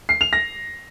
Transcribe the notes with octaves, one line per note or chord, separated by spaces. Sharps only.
C7
F7
A#6